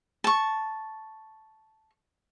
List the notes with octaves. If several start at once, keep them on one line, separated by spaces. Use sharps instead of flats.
A5 C#6